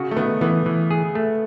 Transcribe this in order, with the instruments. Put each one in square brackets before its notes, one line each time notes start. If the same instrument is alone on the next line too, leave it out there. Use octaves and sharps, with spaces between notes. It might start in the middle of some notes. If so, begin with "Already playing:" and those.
Already playing: [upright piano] C#3 [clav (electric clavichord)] F#4
[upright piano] A3
[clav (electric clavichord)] D#3 [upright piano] B3
[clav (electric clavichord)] E3 [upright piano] B3
[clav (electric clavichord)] E3
G#4
A3